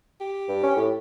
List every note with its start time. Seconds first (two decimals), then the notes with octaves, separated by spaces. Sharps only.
0.20 G4
0.48 G2
0.63 C#4
0.76 A2